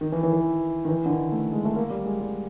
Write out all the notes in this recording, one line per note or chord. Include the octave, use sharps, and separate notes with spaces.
D#3
E3
E3
E3
D#3
E3
D3
D#3
A3
G#3
A3
A#3
G3
G#3
G3